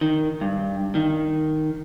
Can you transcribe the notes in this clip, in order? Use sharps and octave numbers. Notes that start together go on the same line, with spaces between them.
D#3
G2
D#3